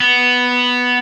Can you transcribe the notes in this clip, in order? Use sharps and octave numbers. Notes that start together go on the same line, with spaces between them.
B3